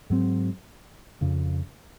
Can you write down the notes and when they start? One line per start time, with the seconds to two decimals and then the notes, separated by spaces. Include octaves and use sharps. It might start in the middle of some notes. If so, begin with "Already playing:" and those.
0.10 G#2 F#3 C4
1.21 F2 C#3 F3